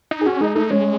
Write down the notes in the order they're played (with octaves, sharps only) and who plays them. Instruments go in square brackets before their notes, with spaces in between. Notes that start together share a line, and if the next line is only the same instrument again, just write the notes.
[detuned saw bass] D#4
[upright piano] G#4
[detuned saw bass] C#4 [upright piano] F#4
[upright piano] G#3 G#4 [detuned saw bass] D#4
[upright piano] A3 A4 [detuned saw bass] D#4
[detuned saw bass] G#3 [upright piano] C#4 C#5